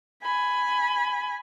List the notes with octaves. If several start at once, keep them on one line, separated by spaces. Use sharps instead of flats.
G#5 B5